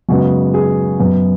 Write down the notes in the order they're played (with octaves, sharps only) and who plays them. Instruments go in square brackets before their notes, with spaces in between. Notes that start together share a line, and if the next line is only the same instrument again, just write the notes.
[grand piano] F#2 C#3 G#3 B3 F#4
G#4
F#2 F#3 B3